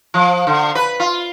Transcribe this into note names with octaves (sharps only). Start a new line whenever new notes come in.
F3
D3
B4
F4